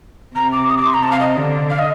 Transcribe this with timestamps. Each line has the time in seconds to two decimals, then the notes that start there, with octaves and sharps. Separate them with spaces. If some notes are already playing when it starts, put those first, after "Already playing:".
0.35 C3 A#5
0.52 D6
0.69 D#6
0.77 D6
0.86 C6
0.94 A#5
1.03 C3 A5
1.11 F5
1.20 D#5
1.36 D3
1.70 F5
1.79 D#5